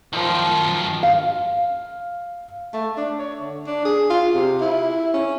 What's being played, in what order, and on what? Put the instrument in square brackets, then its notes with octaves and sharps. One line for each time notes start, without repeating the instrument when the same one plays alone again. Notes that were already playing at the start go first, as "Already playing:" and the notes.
[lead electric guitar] F#2 D#3 [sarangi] F3
[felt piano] F5
[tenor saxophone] A3
D4
C#5
D3
D4
G#4
F4
C3
E4
C#4